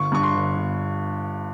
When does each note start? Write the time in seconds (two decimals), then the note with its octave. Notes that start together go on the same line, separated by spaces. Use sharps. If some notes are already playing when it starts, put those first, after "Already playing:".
Already playing: G1 C#6
0.12 G2 C#6
0.23 C6
0.35 G1
0.56 G1